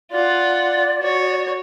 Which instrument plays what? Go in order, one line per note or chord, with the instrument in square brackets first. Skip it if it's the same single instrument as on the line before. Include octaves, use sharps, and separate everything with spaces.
[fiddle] F4 F#5 [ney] D5
[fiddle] F#4 C#5